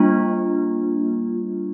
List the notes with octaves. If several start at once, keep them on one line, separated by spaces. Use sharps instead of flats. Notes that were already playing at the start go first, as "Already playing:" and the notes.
Already playing: G3 A#3 D4 F4